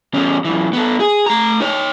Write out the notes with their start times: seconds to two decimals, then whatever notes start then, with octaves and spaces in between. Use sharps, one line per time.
0.14 E2 C#4
0.45 F#2 E3
0.73 B3 A4
1.00 G#4
1.26 A3 A#5
1.60 D#4 C#5